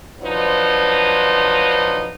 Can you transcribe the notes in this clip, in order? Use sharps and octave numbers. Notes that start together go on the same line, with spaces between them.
F3 F#3 D4 D#4 B4 C5